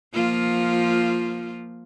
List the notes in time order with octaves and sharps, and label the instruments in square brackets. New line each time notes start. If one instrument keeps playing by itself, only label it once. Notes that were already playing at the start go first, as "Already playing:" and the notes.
[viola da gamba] F3 A#3 F4